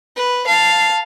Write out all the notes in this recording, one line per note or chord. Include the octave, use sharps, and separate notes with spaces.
B4
F5 A5